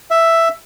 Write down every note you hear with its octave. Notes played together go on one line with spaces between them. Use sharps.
E5